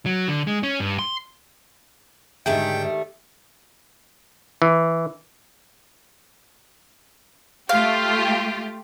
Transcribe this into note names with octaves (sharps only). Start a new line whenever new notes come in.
F#3
D3
G#3
C#4
G2
C6
G#2 D3 D#3 G3 A3 G#4 E5 G5
E3
A3 F4 G4 F5